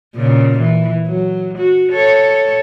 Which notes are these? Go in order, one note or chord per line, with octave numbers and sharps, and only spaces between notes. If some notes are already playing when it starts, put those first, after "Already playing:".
A#2 C#3
E3
F#3
F#4
A4 C#5